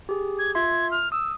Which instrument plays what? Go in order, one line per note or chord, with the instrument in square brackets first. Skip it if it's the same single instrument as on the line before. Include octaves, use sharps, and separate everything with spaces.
[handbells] G4 G#4
[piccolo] G#6
[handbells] F4 E5 C6 [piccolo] G#6
[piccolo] F6
[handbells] D#6 [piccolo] E6